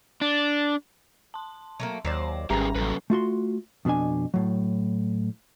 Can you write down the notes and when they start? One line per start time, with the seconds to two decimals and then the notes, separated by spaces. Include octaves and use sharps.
0.21 D4
1.34 A5 C6
1.80 F#3 A3 A#3
2.05 D#2 F#3 C5 D5
2.50 G#1 G3 C#4 G4 G#4 B4 A#5
2.75 A1 F#3 A4 B4
3.10 A3 F4 F#4 C6
3.85 F2 B2 D#3 D4 G#5
4.34 A2 F#3